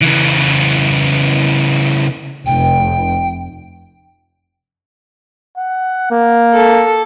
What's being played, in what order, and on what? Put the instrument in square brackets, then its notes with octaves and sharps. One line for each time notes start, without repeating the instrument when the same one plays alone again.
[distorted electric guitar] C#3 E3
[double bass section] F1 [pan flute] G5
[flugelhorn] F#5
A#3
[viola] A4